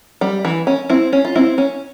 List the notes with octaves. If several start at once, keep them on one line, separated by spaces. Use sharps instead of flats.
G3
E3
C#4
C4 E4
C#4
F4
C4 E4
C#4